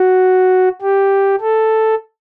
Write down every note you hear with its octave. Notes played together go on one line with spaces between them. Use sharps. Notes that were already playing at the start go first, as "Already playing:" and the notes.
Already playing: F#4
G4
A4